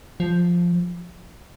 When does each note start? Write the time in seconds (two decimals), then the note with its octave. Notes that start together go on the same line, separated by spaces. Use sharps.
0.20 F3